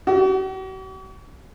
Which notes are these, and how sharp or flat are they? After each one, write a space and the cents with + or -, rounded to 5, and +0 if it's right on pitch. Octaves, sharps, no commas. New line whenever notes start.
F#4 +45